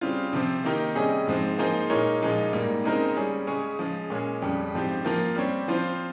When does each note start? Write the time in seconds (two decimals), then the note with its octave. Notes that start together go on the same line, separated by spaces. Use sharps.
0.01 C#3 G3 C4 F4
0.33 C3 F3 C4
0.64 D#3 A#3 D#4 G4 A#4
0.95 C3 G3 C#4 G#4 D#5
1.27 G#2 F3 G#3 C4
1.58 F3 A#3 D#4 G#4 C5
1.90 A#2 G#3 D#4 A#4 C#5
2.22 A#2 F3 G#3 D#4
2.53 G#2 G3 A#3
2.84 C#3 G#3 C4 D#4 A#4
3.17 G3 C#4 G#4
3.47 C#3 G#3 C#4 G#4 C#5
3.79 C#3 F3 G#3
4.10 A#2 G#3 C#4 G#4
4.42 F2 C#3 G3
4.73 G#2 F3 C4 G4
5.05 F3 A#3 F4
5.36 G3 C4 G4 C#5
5.68 F3 C4 F4 C5